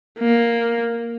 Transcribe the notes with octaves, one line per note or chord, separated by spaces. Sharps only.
A#3